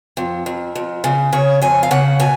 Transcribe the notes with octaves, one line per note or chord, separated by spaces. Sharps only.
F2
F2
F2
C#3
C#3 C#5
F2 G#5
F5
C#3 F#5
B2 G#5